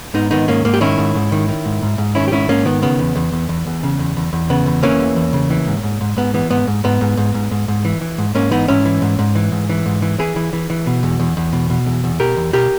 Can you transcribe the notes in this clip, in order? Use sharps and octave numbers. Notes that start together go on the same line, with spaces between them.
G#2 B3 D#4
D#3 B3 D#4
G#2 A#3 C#4
G#2 A#3
G4
D#3 C#4 E4
G#2
G#2
D#3
D#3
G#2
G#2
G#2
D#3 C#4 E4
G4
G#2 C#4 E4
G#2 A#3 C#4
D#3 B3
C#3 B3
E2
E2
E2
E2
E2
C#3
E2
E2
E2
C#3 B3
E2
E3 A#3 C#4
E2
E2
C#3
E3
G#2
G#2
G#2
G#2 B3
E3 B3
G#2 B3
G#2
G#2 B3
G#2
G#2
G#2
G#2
G#2
E3
E3
G#2
G#2 A#3 C#4
E3 B3 D#4
G#2 C#4 E4
E3
G#2
G#2
E3
G#2
E3
G#2
E3
E3 E4 G#4
E3
E3
E3
B2
E2
E2
E2
B2
B2
E2
E2
B2 G4 A#4
E2
B2 G4 A#4